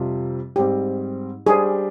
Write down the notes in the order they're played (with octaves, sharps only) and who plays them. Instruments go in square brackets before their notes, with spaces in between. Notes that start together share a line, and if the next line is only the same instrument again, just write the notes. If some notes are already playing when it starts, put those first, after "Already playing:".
Already playing: [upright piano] F2 C3 G3 C4 F4
[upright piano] G#2 G3 C4 [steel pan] G4
[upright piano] G3 D4 G4 C5 [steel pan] G#4